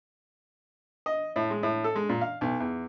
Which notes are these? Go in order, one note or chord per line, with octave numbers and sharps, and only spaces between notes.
D#5
A2
G#3
A2
A4
G#3
A#2
F5
B1
E2